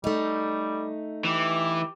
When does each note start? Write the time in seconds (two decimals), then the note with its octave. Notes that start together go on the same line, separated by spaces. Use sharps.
0.04 G3 A3 D#4
1.25 E3 G4